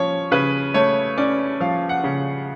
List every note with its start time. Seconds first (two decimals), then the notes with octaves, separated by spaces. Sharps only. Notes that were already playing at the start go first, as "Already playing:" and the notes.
Already playing: F3 C#4 C#5
0.31 C#3 B4
0.74 A3 C#5
1.18 C#4 D5
1.60 F3 F5
1.89 F#5
2.04 C#3